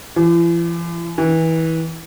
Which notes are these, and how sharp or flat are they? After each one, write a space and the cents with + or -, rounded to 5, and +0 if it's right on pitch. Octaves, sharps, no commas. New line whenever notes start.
E3 +45
E3 -25